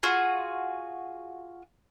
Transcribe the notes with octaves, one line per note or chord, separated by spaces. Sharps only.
F4 F#4 G#4